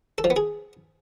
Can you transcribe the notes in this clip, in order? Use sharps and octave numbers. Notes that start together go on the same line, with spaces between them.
A4
F3
B3
G#4